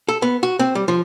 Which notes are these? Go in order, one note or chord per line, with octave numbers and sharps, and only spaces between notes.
A4
B3
F#4
C4
G3
F3